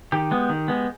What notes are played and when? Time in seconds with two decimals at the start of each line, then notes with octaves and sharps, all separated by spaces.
0.12 D#3 G4
0.31 G#3 B3
0.49 D#3
0.68 G#3 B3